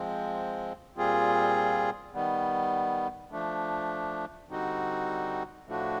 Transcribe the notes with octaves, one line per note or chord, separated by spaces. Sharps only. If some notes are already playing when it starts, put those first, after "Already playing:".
Already playing: F3 G#3 C4
A#2 G3 C4 F4 G#4
D#3 G3 B3
F3 A3 D4
D3 G3 C4 D#4 F#4
A2 F3 A3 D4 F#4